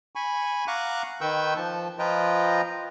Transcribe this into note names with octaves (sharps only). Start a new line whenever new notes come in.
G#5 B5 C#6
F5 F#5 A#5 C#6 D6 F#6
D#3 B4 G5 C#6 E6 G6
F3 A5
F3 F4 B4 D#5 G5 A#5